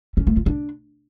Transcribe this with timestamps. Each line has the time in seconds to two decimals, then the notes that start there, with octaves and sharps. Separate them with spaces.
0.17 C#4
0.27 A3
0.36 F4
0.46 D4